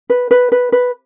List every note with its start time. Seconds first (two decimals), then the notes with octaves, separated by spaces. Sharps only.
0.10 B4
0.31 B4
0.52 B4
0.72 B4